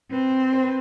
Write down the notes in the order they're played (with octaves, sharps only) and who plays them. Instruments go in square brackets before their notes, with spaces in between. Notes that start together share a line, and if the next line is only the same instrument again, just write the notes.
[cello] C4 [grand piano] B4
[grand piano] C5
B4